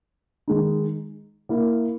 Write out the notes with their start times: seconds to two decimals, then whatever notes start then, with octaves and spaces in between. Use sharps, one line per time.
0.48 D#3 G#3 D#4
1.49 A#3 E4 A#4